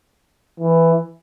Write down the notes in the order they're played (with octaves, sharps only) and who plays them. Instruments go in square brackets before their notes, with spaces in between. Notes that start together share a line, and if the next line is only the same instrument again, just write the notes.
[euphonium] E3